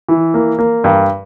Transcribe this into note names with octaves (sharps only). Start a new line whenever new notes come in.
E3
A#3
A#3
G2